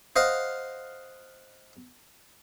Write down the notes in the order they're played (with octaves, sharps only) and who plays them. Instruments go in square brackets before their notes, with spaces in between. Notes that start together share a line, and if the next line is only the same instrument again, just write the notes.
[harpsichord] C5 D#5 F5 F#5